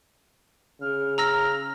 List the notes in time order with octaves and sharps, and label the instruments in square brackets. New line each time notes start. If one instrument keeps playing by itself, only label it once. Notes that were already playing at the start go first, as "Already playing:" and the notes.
[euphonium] C#3 [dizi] F6
[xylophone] A#5 E6 A#6 [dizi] F6